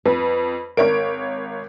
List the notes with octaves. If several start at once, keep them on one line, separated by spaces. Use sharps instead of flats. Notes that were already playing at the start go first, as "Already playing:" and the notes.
F2 B4
G#1 A#4 C#5 D7